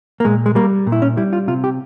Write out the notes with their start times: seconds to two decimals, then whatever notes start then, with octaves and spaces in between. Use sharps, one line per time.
0.20 A#3
0.25 A#2 G#3
0.46 G#3
0.55 G3 A#3
0.87 A#2
0.92 E4
1.02 C#4
1.17 G3 E4
1.33 F4
1.48 C3 F4
1.64 G4